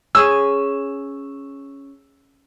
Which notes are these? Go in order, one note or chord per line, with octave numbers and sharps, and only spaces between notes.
C#4 G#4 E6